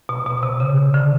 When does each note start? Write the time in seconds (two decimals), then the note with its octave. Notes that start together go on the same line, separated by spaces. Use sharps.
0.09 B2
0.26 B2
0.43 C3
0.60 C#3
0.94 D3